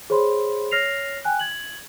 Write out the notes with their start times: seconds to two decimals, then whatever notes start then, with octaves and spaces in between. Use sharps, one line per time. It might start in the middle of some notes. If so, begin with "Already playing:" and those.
0.10 G#4 C5 C#5 B5 C6
0.71 C#5 F6 A#6 C7 F7
1.25 G5 G#5 F#6
1.39 G#6 F#7